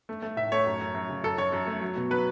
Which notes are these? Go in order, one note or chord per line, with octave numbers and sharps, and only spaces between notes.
A3
A3
A2 E5
A3 C#5
F#2
F#2
F#2
C#3
F#2 A4
F#2 C#5
F#2
A3
F#3
B2
F#3 B4